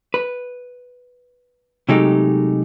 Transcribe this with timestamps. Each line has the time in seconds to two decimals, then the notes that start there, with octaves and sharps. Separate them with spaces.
0.14 B4
1.89 C3 F#3 G#3 A3 D#4 G4